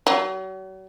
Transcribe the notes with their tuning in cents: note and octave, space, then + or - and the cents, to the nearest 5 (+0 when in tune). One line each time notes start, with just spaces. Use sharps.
F#3 +40